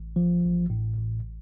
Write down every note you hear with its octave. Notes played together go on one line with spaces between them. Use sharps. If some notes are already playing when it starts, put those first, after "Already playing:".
Already playing: A1
F3
A1
A2
A1